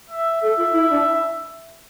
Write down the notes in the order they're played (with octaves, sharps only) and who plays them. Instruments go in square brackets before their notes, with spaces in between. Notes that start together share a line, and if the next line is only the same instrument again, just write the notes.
[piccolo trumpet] E5
[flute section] A4 [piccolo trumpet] E5
[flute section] F4
E4
D4
E4